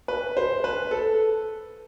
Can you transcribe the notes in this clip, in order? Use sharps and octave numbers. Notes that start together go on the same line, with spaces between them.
B4
C5
B4
A4